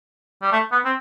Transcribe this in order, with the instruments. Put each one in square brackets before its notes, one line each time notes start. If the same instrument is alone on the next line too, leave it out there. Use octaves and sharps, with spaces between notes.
[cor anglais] G3
A3
B3
C4